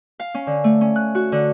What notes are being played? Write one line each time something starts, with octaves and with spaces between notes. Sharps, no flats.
F5
C#4
D3
A3
C#4
F#6
F#4
D3